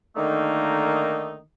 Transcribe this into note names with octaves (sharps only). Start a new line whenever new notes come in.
D3 D#3 A3 A#3 D#4